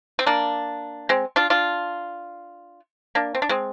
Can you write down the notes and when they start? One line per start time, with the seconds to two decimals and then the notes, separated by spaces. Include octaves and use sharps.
0.19 C4
0.26 A#3 D4
1.09 G#3 C4
1.36 D4 F4
1.50 D4 F4
3.15 A#3 D4
3.35 C4
3.42 D4
3.49 G#3 C4